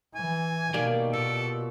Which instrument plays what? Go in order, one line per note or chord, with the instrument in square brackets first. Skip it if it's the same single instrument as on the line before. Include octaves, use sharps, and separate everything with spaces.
[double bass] E3 [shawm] G#5
[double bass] B2 [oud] D#3 A#3 [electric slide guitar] G4 D5
[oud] A#2 [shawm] A4